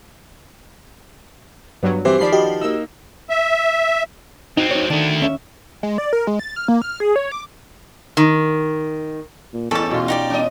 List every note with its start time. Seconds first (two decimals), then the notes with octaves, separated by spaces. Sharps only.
1.83 G2 F#3 B3
2.05 E3 C4 G4 C5 D6
2.19 D#3 F3 D5 B5 C7
2.32 F#4 G4 D#5
2.61 A#3 D#4 E6
3.30 E5
4.57 F#3 C4 D#4
4.71 D#4 C#5
4.90 D#3 A3 D4
5.20 D#2 C#4 E5
5.83 G#3
5.98 D5
6.13 A#4
6.27 G#3
6.39 A6
6.56 F6
6.68 A#3
6.82 F6
7.00 G#4
7.16 C#5
7.32 D6
8.17 D#3
9.53 A#2
9.71 E2 G#2 C#4 A4 D5 A5
9.91 B2 F4
10.08 D#4 G4 D5
10.30 E1 C#4 D#5